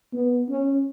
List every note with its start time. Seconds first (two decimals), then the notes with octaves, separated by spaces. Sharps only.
0.13 B3
0.49 C#4